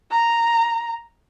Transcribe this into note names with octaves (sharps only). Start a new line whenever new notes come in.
A#5